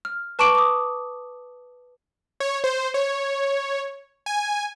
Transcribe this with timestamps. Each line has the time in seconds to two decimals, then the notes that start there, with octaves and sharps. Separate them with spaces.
0.05 F6
0.39 B4 A5 C#6 D6 D7 F#7
0.55 D6 D#6
2.40 C#5
2.64 C5
2.94 C#5
4.26 G#5